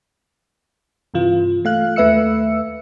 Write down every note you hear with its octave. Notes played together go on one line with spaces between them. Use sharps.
G2 C3 E3 F4
A3 F5 F#6
D#2 A3 B4 E5 E6 C#7